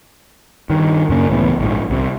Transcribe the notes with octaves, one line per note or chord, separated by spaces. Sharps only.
G2 D#3
F#2 C#3 A#3
C#2 A2 E3 B3
A#1 G#2 F3
C2 C3